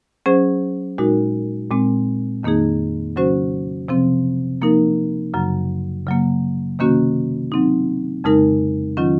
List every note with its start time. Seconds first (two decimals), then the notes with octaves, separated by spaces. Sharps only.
0.26 F#3 C#4 G#4 C5
0.98 A#2 G#3 D#4 F#4 A#4
1.71 A#2 G#3 C4
2.43 F2 D#3 A#3 D#4 G#4
3.16 C#3 F#3 C#4 F#4 C5
3.88 C3 F3 C4
4.61 F3 A#3 D#4 A#4
5.34 F#2 C#3 F#3
6.07 C#3 F#3 A#3
6.79 C3 D#3 A#3 C#4 F#4
7.52 F#3 C4 D#4
8.24 F2 C#3 G#3 D#4 A#4
8.97 D#3 F#3 C#4 F4